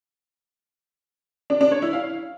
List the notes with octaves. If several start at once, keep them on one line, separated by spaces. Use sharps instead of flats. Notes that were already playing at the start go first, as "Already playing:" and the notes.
D4
D4
C#5
E4
F5